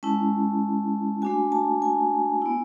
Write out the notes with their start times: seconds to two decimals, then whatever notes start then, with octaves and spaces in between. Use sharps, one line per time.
0.03 G#3 C#4 E4 A5
1.22 A3 D4 F#4 G#5
1.52 A5
1.82 G#5
2.42 B3 E4